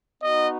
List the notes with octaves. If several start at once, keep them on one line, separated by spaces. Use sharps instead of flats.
B3 D#4 F#4 D#5